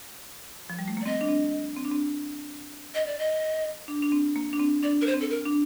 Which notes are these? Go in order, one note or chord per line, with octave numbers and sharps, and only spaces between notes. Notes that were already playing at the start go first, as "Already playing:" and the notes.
F3
G3
A3
A#3
D5
C4 D#5
D4
C4
C4
D4
C4
D#5
D5
D#5
D4
D4
C4
A#3
D4
C4
D4 D5
A#4
C5
C4
A4
A#4
D4